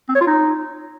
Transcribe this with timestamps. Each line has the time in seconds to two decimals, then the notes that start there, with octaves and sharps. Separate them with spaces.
0.09 C4
0.15 C#5
0.21 F4
0.27 D#4